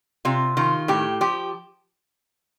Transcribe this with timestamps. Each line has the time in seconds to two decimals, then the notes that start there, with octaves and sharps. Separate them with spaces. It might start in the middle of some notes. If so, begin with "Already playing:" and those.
0.25 C3 F4
0.57 D#3 F4
0.88 A2 G4
1.21 F3 G4